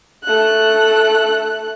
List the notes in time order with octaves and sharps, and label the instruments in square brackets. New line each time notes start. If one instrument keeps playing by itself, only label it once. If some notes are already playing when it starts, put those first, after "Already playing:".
[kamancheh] A3 F#6